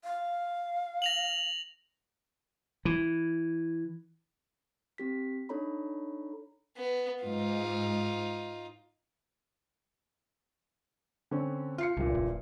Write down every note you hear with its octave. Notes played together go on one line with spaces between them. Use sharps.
F5
A#6 F7 F#7
E3
C4 G4 B6
D4 D#4 A4 C#5 A#5 B5
B3
G#2 D#4 F4
D3 C4 C#4
F4 F5 C7 C#7
F#1 C2 G2 A#2
D#1